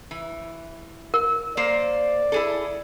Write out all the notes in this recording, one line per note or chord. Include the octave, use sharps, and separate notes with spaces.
E3
A#4
A#3 C5 D5
E4 G#4 A4